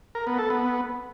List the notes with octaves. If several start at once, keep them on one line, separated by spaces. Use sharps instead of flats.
A#4
B3
A4
B3